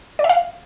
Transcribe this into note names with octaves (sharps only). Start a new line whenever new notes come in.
D5
E5
F5